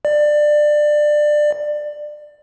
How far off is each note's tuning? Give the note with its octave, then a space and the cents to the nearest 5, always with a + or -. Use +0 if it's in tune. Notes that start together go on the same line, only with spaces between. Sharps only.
D5 +20